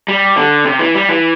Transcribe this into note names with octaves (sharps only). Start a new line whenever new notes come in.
G3
D3
C3
E3
G3
E3